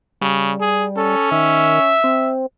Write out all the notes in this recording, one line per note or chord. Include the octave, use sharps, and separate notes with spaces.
C#3 G3
G#4
C#4 A4
D#3 E5
C4